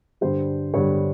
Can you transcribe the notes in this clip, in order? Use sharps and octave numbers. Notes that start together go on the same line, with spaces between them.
G2 D3 G3 C5
G2 D3 G3 C#5